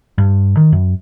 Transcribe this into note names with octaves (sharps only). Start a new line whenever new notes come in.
G2
D#3
F#2